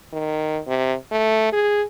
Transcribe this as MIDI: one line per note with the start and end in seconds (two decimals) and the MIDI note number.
0.13 0.60 51
0.67 0.94 48
1.11 1.51 57
1.52 1.83 68